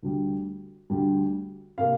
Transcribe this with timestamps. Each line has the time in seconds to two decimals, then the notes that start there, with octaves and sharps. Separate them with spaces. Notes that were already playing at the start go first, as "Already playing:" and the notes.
0.03 D2 D3 G3
0.90 D2 D3 G3
1.78 C3 A#3 F5